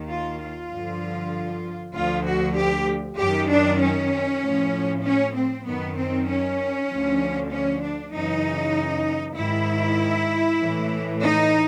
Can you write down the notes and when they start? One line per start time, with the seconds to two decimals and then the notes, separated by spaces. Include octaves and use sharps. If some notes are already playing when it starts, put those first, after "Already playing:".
Already playing: D#2 D#3
0.09 F4
0.39 F4
0.70 G2 D3 F3
1.94 D2 D3 F3 F4
2.25 F#4
2.56 G4
3.18 F#2 D#3 G4
3.49 D4
3.80 C#4
4.41 A2 F3
5.03 C#4
5.34 C4
5.64 F#2 D#3 B3
5.95 C4
6.27 C#4
6.88 D2 D3 F3
7.51 C#4
7.81 D4
8.12 F#2 C#3 E3 D#4
9.35 G#2 D#3 E4
10.59 A2 E3
11.21 D#4